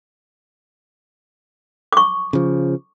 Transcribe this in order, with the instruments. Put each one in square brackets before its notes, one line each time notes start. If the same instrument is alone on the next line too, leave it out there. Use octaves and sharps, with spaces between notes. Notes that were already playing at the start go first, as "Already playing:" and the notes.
[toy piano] C#6 D6
[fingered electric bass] C#3 F3